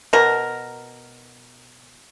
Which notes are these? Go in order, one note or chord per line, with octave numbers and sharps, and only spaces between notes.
B2 A#4